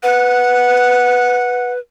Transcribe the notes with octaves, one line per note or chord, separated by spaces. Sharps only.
B4 F#5